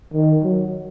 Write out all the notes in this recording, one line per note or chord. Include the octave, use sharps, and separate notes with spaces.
D#3
F#3